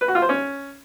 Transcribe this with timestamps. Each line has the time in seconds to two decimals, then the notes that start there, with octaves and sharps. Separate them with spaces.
0.01 B4
0.08 F#4
0.15 F4
0.22 C5
0.29 C#4